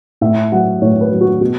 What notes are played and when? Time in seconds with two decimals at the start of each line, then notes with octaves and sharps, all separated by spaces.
0.21 A2 E5
0.52 F#3 F#5
0.82 A2 C#5
1.01 B4
1.11 F#3
1.21 F#4
1.41 B2 F#4